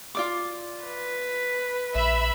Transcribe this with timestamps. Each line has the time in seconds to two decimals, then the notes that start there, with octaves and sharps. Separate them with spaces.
0.15 F4 D5 D6
0.84 B4
1.95 A#1 E5 B5